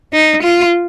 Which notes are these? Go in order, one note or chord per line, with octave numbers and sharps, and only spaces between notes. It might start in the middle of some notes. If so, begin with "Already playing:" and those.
D#4
F4